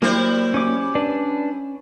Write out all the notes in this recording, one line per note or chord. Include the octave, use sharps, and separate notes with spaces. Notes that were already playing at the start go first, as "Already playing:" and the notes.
F#3 G3 A#3 E4 A#4 C5
C#4 D6
D4 B4 D5